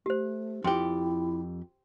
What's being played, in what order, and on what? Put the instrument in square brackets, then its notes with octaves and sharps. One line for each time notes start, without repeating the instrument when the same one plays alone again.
[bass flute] A3 [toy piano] G4 C5
[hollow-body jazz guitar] F2 G4 [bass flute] E4 [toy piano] G5 C6